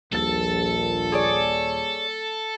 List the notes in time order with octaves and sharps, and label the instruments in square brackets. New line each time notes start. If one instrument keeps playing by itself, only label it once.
[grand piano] D#1 A6 [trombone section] A#1 [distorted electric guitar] A4
[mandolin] G#4 C#5 D5